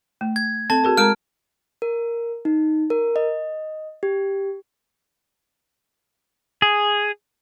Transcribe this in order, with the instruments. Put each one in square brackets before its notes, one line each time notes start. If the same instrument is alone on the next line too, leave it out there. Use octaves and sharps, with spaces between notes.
[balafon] A3
[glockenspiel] G#6
[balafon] C4 A4 [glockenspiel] A5
[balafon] F#4 G#4 A#4
[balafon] G#3 A#4 A#5 [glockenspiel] F6 D7
[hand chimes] A#4
D#4
A#4
D#5
G4
[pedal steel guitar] G#4